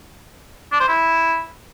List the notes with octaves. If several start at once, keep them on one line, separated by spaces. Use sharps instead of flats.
D4
C5
E4